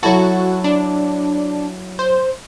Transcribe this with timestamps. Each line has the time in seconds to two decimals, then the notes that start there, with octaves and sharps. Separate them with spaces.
0.03 F#3 E4 F#4 A4
0.64 D4
1.99 C5